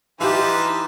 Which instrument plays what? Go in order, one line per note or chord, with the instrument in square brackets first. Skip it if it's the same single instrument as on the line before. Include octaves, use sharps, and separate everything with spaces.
[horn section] E3 [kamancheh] D#4 [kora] G4 F5 [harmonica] B4 C5 A5